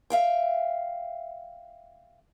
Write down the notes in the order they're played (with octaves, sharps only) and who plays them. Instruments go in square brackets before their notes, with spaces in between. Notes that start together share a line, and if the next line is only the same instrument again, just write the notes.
[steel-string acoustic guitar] E5 F5 G5